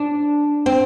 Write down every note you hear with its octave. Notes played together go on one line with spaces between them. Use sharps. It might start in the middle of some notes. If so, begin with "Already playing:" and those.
Already playing: D4
C4